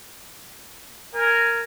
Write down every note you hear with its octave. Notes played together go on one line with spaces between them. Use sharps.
A#4 G#5